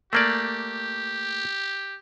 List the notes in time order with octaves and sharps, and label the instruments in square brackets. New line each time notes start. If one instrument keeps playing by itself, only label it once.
[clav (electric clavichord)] A3 A#3 D5 [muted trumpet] G4